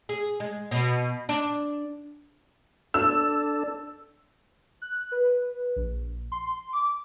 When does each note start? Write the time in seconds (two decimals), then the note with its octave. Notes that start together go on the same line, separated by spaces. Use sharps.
0.09 G#4
0.40 G#3
0.71 B2
1.29 D4
2.94 D4 A4 E6
4.82 F#6
5.12 B4
5.76 A#1
6.32 C6
6.73 D6